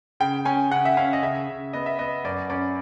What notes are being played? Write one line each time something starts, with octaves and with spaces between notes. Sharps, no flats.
C#3 G5
C#4 G#5
C#3 F#5
E5
C#4 F5
D#5
C#3 E5
C#3
B3 D#5
E5
B3 D#5
F#2 D5
C#4 D5